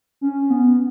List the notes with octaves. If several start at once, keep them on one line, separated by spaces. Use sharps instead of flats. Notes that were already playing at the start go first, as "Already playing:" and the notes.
C#4
B3